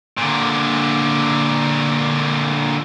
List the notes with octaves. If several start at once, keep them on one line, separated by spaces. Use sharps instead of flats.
A#2 D3